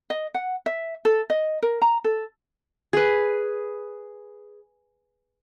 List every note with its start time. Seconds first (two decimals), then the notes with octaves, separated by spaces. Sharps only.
0.10 D#5
0.34 F#5
0.66 E5
1.05 A4
1.30 D#5
1.62 A#4
1.82 A#5
2.04 A4
2.93 G#4 B4